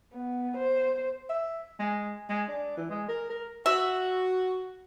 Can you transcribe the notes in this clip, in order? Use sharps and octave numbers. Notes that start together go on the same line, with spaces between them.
B3
C5
E5
G#3
G#3
D4
E3
G#3
A#4
A#4
F#4 E5